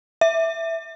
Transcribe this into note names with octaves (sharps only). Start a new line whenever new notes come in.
E5